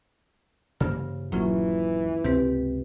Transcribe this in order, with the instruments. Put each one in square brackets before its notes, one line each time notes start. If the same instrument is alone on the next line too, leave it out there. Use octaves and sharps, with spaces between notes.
[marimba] G2 C5 F6 [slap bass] C#3 E3 A#3
[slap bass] D#1 D#2 [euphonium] E3 [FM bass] F#3 [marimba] A#3 C#4 F4
[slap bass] C#2 C3 [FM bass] C4 [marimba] G4 B4